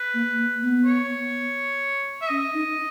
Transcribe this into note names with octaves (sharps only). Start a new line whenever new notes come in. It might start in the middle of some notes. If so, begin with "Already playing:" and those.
Already playing: B4
A#3
A#3
B3
C#5
E5
C#4 D#5
D#4